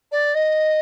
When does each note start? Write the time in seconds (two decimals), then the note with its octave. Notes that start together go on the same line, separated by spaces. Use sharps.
0.12 D5
0.34 D#5